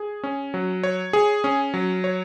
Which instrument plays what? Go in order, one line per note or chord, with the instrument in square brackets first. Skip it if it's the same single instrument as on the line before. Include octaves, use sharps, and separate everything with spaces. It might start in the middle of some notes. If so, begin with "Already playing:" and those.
Already playing: [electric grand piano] G#4
C#4
F#3
C#5
G#4
C#4
F#3
C#5